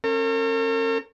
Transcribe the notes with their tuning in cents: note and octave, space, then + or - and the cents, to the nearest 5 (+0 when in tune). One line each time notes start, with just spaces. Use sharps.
C#4 -35 A#4 -45